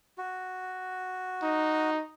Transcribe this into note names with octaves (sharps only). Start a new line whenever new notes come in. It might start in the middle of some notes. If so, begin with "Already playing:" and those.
F#4
D#4